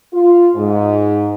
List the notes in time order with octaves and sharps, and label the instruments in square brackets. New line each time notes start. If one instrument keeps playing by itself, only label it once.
[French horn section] F4
G#2